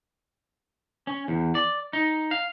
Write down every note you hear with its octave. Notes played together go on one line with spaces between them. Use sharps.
C#4
E2
D5
D#4
F5